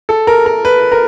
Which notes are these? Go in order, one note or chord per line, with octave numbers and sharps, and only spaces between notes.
A4
A#4
A#4
B4
A#4